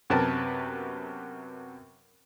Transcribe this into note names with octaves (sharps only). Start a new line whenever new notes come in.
F#2 C3 B3 A#4 B4 A5